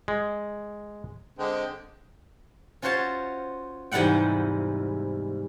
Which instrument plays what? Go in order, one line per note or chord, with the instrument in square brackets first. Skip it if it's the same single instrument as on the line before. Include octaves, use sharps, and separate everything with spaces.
[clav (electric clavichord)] G#3
[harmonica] D3 G#3 C4
[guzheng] C#4 F4 F#4 C5 C#5 A5
E2 G#2 C3 G3 F#5 G5